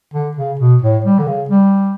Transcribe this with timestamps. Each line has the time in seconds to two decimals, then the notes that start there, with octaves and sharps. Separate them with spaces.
0.14 D3
0.36 C#3
0.59 B2
0.82 A2
1.04 G3
1.19 D3
1.27 C#3
1.49 G3